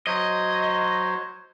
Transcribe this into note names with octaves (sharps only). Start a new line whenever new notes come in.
F#3 C5 C#5 D#5